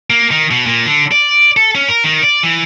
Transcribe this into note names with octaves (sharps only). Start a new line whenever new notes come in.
A#3
D#3
B2
A#2
D3
D5
A4
C#4
A#4
D#3
D5
E3